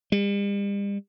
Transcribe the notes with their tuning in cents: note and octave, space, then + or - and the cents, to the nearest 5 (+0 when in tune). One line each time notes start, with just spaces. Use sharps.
G3 +45